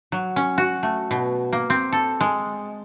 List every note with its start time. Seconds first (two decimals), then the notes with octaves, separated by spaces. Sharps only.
0.12 F#3
0.36 C#4
0.58 F#4
0.83 A3
1.11 B2
1.53 A#3
1.70 C4
1.92 A4
2.21 G#3